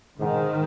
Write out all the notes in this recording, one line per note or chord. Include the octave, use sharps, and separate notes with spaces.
G#2 D#3